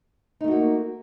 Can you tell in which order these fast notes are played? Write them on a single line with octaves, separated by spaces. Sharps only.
D#4 A3 F#4 A#3